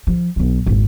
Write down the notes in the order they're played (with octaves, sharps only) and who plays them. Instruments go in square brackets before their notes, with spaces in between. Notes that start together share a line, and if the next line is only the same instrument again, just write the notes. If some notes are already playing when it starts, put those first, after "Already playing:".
[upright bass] F3
D1 B1
G#1 F2